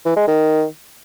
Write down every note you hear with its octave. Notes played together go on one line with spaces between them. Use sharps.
E3
G#3
D#3